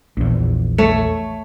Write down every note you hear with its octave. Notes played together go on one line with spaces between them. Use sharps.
A#1 E2
A3 C#5